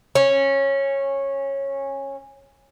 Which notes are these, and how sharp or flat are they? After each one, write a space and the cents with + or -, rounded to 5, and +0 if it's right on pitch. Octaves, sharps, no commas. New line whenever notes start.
C#4 -15